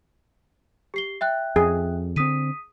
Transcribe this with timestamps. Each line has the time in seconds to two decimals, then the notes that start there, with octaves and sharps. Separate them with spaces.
0.94 G4 C7 G7
1.21 E5 G5 F#6
1.56 F2 G#4
2.16 D3 C4 D#6 B6 D#7